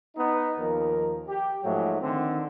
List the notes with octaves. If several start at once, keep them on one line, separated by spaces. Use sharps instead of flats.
B3 D#4
D#2 F3 A#4
G4
G#2 F3 F#3 A3
D3 D#3 C4